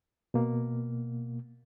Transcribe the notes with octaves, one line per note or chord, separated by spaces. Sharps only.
B2 A#3